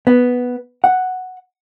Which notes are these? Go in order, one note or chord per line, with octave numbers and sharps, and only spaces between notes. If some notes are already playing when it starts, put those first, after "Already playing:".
B3
F#5